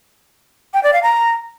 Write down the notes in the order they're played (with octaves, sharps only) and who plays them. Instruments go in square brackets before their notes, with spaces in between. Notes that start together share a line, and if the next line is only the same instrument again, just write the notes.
[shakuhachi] G5
D5
F5
A#5